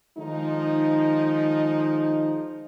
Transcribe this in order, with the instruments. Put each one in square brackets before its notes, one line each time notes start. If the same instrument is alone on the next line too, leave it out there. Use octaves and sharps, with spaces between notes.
[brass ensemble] D#3 F3 G#3 D#4